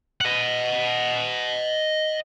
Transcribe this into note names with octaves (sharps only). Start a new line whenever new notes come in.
D#5 F#5